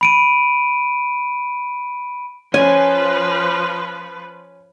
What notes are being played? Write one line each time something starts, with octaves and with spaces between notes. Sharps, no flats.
B5 D7 D#7
F3 C#4 B4 G#5